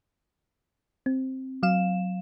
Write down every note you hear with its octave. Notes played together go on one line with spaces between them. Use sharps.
C4
F#3 F5 E7